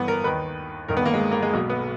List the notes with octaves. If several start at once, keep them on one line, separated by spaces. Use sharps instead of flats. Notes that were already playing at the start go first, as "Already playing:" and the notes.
Already playing: G1 G2 E3 B3
A#4
D#2 D#3 B4
G1 G2 D#3 A#4
B3
A#3
G#3
A#3
G#3
B1 B2 A#3
B3